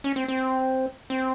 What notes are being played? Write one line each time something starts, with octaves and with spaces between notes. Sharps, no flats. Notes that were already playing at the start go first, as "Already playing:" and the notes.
C#4
C4
C4
C4